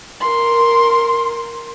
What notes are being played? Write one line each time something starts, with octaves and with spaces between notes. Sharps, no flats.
A#4 C6